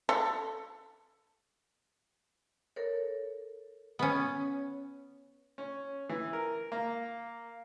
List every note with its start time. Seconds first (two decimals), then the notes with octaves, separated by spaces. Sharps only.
0.09 A4
2.76 A4 A#4 C#5
3.99 B3 C#4
5.58 C#4
6.09 E3
6.33 A#4
6.72 A#3